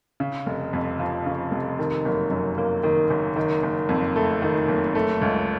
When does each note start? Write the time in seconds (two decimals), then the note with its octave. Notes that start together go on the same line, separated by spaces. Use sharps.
0.20 C#3
0.46 F1
0.73 F2
0.99 F3
1.26 C#3
1.51 F1
1.79 D#3
2.05 F#1
2.31 F#2
2.58 A#3
2.83 D#3
3.10 F#1
3.36 D#3
3.63 F#1
3.89 F2
4.16 A3
4.42 D#3
4.68 F#1
4.95 A3
5.21 C#2